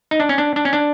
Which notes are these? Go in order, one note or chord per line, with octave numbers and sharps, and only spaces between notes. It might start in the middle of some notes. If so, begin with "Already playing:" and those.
D#4
D4
C#4
D4
D4
C#4
D4